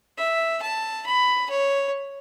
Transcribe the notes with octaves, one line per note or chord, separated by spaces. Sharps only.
E5
A5
B5
C#5